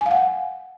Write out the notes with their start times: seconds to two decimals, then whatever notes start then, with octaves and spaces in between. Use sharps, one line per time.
0.01 G#5
0.06 F5
0.11 F#5